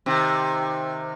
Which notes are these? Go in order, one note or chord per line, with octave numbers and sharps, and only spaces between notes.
C3 D#3